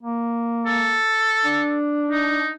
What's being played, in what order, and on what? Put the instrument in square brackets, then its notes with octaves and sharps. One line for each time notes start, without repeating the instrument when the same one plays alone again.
[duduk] A#3
[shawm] A4
[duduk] D4
[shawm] D#4